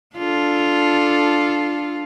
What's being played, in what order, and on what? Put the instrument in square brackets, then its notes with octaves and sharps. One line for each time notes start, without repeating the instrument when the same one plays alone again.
[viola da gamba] D4 F4 A4